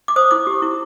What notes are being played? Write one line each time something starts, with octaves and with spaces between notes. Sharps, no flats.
D6
C5 D#6
E4 D6
G4
E4